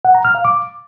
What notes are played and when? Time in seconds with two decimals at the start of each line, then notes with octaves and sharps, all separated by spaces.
0.05 F#5
0.15 A#5
0.25 F6
0.35 F5
0.45 D6